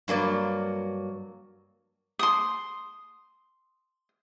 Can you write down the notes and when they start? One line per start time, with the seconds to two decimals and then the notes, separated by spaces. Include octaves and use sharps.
0.08 G2 F#3 A#3 D5
2.19 C6 D#6